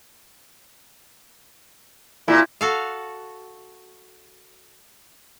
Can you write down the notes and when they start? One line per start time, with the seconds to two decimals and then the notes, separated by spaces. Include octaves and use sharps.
2.28 A#2 E4
2.61 F#4 A4 F5